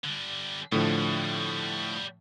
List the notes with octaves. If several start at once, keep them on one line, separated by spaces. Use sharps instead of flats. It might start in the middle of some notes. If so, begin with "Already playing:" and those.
D3 G3
A2 D3 F3 G3 F#4